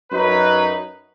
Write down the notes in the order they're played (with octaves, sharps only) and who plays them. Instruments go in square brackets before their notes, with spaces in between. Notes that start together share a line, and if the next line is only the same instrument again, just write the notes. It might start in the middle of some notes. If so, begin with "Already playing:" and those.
[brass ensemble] F#2 F#3 D#4 B4